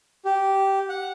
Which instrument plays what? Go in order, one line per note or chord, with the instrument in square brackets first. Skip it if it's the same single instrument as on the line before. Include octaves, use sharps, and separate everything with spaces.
[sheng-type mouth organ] G4
F#5